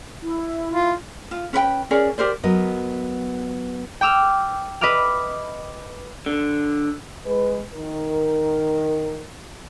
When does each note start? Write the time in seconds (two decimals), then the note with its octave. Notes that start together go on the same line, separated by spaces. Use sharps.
0.22 E4
0.72 F4
1.31 F4
1.53 C#4 B4 C5 G5
1.91 C#4 G#4 A#4 D5
2.18 G4 A#4 C5 D5
2.44 F#3 B3 A#4 D#5
4.01 G5 D6 E6 F6
4.81 B4 D#5 E5 D6 F6
6.26 D3
7.26 G#3 B4
7.75 D#3 A#4